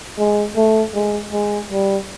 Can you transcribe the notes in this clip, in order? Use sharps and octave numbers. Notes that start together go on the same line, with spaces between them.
G#3
A3
G#3
G#3
G3